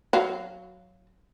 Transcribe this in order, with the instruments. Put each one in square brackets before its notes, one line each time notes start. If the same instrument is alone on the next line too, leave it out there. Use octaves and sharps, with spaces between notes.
[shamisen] F#3 F5